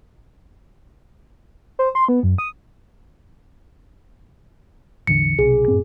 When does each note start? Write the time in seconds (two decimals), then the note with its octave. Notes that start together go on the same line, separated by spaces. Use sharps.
1.79 C5
1.95 C6
2.09 B3
2.23 F#2
2.38 D#6
5.07 A1 E2 D3 C#7
5.39 B1 C3 G#4
5.68 F#2 A2 C4